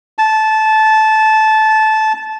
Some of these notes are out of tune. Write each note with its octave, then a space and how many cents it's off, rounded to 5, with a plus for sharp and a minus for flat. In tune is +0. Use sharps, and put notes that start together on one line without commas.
A5 -15